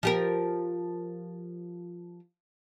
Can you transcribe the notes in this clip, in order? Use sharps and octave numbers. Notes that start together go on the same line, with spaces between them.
F3 G4 A#4